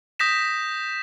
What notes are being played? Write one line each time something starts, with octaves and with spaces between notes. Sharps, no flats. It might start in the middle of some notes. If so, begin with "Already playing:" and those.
D#6 G6 A#6 B6 E7